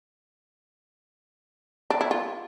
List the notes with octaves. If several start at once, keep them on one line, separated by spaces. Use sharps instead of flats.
D4
E4
F4